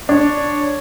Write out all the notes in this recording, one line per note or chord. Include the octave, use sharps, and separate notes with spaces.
D4 C#5